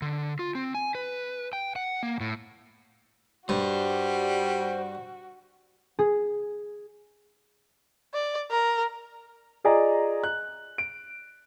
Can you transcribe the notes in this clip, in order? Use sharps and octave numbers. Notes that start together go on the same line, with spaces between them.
D3
F4
C4
G#5
B4
G5
F#5
A#3
A2
G2 G3 F#4 C5
G#4
D5
A#4
F4 G#4 D5 D#5 G#5 A#5
F#6
D7